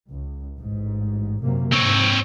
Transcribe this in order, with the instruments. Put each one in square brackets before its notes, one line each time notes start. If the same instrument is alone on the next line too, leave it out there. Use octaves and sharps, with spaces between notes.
[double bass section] C#2
A1 G#2
F#2 C3 A#3
[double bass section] G#2 [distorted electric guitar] C4 C#5